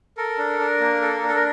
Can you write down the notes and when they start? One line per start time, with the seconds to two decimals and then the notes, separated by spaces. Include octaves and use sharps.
0.17 A4 A#4
0.38 D4
0.59 D4
0.80 A#3
1.02 A4
1.23 D4
1.28 A4
1.35 A#4